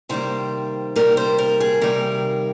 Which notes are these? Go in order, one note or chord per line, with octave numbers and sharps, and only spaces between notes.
C3 D#3 G3 A#3 C5
C3 D#3 G3 A#3 A#4
C5
A#4
G#4
C3 D#3 G3 A#3 A#4